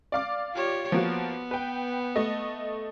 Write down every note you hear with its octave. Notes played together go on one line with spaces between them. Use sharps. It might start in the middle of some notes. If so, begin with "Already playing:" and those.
D5 F5 D6
F4 G4 C#5
F3 A#3 B3 F#4
B4 G5
A3 D#5